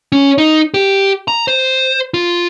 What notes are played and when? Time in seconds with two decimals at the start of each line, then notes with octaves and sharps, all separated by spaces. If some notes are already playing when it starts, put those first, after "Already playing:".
0.12 C#4
0.38 D#4
0.74 G4
1.28 A#5
1.48 C5
2.14 F4